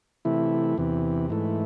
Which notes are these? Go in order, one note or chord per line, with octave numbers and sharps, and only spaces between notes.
C3 E3 A3 E4
E2 C3 E3
G#2 E3 A3